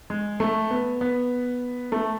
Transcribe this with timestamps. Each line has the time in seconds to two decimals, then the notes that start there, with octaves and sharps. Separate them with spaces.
0.10 G#3
0.40 A3
0.71 B3
1.01 B3
1.92 A3